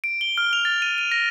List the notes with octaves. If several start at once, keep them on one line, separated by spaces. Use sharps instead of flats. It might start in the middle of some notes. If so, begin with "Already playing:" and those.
D7
G7
F6
F7
A6
D#7
D#7
A#6